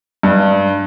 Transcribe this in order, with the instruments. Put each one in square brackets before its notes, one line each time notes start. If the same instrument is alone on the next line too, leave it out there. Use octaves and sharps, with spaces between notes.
[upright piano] G2